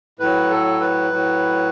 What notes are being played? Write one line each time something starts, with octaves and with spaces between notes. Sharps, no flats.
A2 F#3 B4
A4
B4
A2 F#3